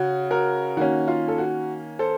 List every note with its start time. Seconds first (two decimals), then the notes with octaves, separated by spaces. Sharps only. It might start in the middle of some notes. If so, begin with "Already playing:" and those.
Already playing: C#3 F#4
0.31 F#4 A#4
0.77 D#3 A#3 C#4 F#4
1.08 F4
1.28 A4
1.38 F#4
1.99 A4 C5